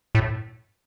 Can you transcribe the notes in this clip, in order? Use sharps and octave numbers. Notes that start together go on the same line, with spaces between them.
A2